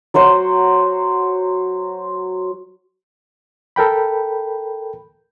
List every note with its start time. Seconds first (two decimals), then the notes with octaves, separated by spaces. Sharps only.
0.14 F#3 F#4 C5 F#5
3.76 A4 A#4 G5 B5